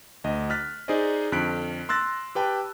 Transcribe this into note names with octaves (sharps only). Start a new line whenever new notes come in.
D2 D#5
F6 F#6 A6 B6
D#4 G#4 C5 D5 D#5
F2 D3 F#6 B6 D7
C6 E6 F#6 A6 A#6
G4 B4 G5 A5